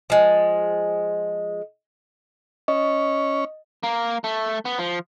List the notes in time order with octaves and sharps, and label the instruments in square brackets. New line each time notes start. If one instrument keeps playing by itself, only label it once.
[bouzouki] F3 G#3
[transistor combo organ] C#4 [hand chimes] D#5
[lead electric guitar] A#3
A3
B3
F3